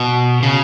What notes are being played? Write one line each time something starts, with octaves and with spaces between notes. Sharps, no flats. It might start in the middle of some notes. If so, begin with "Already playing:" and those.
Already playing: B2
C#3